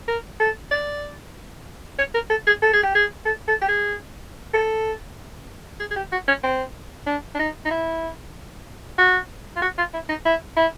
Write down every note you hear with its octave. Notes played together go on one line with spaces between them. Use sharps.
A#4
A4
D5
C#5
A#4
A4
G#4
A4
G#4
G4
G#4
A4
A4
G4
G#4
A4
G#4
G#4
G4
F#4
C#4
C4
D4
D4
D#4
D#4
E4
F#4
F4
F#4
F4
E4
D#4
E4
E4